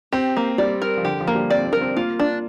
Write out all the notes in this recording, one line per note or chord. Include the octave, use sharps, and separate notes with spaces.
C4 G4
A#3
G3 D5
A#4
F3
D3 G4
F3
A#3
G3
C4 D5
D4
A#4
C4
A#3 F4
D4